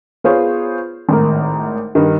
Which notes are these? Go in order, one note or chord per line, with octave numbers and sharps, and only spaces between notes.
B3 F4 G#4 C5 C#5
G#1 A2 A#4
G2 D#3